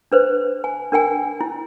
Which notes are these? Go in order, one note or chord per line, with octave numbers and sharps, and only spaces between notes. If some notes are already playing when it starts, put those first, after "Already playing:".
D4 B4 C5
G#5
D4 A#4 G5 G#5
E4